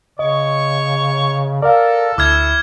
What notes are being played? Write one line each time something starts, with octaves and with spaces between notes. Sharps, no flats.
C#3 C#5 D#5 C#6
A4 A#4 D5 F5
D2 E4 D6 F6 G#6